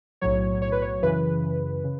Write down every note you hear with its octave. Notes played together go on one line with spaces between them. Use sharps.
B1 A2 F#3 C#5
C#5
B4
C#5
F#2 C#3 E3 B4
C#3